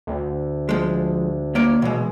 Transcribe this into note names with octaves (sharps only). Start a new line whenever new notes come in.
D2
F3 G#3
A#3 C#5 D5
B2 E3 G#3